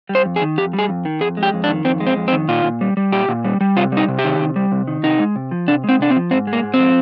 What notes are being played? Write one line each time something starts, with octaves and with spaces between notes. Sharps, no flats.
G3
C5
F2
G#4
D#3
F2 G4
G3
G#4
F2
D#3
F2 G#4
G#3
G4
F2
D4
D#3
F2 C4
G#3
C4
F2
C4
D#3
A#2 F4
A#2
G3
G3
A#2 G4
A#2
G3
G3
C3 F4
G3
D#4
C3
G4
D#3
C3
G3
C3
D#3
C3 D#4
G#3
C3
F3
C3 D4
G#3 C4
C3 D4
C4
F3
G#2 C4
G#3
A#3
G#2
C4
F3